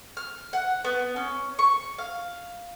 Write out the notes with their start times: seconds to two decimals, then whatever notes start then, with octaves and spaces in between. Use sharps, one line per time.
0.17 F6
0.53 F#5
0.85 B3
1.16 C#4
1.59 C#6
1.98 F5